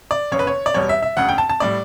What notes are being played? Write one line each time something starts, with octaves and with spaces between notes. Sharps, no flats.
D5
F#1 E2 C#3 C#5
B4
C#5
D5
E2 B2 G3 C#5
E5
E5
E1 D2 C#3 F#5
G5
A5
A5
A2 G3 D5